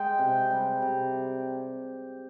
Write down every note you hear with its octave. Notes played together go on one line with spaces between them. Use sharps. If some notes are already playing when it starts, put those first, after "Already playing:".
Already playing: G#3 G5
C3
G3
C3